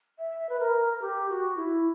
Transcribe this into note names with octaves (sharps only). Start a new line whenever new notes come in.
E5
B4
A#4
A#4
G4
F#4
E4